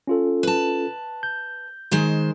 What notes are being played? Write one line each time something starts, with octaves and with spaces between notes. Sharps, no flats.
C#4 F4 A4
B4 A5
G6
D#3 G#3 C5